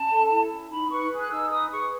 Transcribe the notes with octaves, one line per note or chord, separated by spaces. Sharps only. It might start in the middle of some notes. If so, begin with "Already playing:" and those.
Already playing: C#4 A5
A4
E4
C#4
D#4 B5
B4 C#6
G#4
F#6
D#4 E6
B4 D#6
G#4 C#6